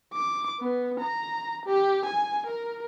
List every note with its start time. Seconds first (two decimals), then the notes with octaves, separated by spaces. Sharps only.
0.13 D6
0.60 B3
1.00 A#5
1.66 G4
2.06 G#5
2.47 A#4